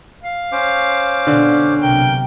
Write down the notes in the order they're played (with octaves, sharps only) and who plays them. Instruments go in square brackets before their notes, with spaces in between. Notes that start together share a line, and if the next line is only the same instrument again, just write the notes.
[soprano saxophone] F5
[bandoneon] C#4 C5 D6
[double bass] B2 [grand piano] D3
[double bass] B1 C3 [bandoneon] A#4 [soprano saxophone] G5